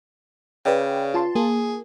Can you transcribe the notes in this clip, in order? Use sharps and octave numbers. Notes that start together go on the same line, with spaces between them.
C#3 B4 D5 G5
F4 A5 C6
A#3 G#4